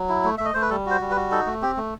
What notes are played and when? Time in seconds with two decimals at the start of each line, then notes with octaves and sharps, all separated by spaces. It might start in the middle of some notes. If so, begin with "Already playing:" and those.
Already playing: F#3
0.09 E4
0.24 A3
0.38 A3 E5
0.45 D#5
0.54 A3 C5
0.62 B4
0.70 G3 A4
0.86 F#4 C5
1.01 G3
1.11 B4
1.16 F#4
1.31 D#4 A4
1.46 A3
1.62 C4 G4
1.77 A3